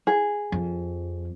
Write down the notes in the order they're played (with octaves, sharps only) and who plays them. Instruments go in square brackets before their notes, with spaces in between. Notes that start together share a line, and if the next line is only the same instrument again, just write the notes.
[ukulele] G#4
[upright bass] F2